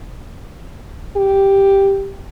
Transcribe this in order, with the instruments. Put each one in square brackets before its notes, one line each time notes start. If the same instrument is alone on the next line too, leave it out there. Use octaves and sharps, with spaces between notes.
[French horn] G4